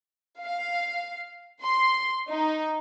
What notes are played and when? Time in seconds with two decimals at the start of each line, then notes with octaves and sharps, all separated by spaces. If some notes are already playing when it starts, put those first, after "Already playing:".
0.42 F5
1.61 C6
2.28 D#4